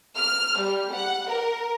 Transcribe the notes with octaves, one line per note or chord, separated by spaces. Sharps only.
F6
G3
F#5
A#4